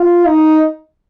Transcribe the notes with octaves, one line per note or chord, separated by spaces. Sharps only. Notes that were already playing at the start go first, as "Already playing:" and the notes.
Already playing: F4
D#4